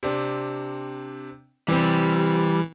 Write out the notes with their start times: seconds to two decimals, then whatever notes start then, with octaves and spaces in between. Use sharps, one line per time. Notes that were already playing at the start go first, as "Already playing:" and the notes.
0.03 C3 C4 D4
1.68 C3 E3 G3 C4